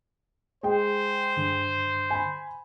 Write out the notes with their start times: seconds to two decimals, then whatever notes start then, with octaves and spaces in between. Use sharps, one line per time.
0.63 G#3 C5 G5
1.37 G2 D3
2.11 G#5 B5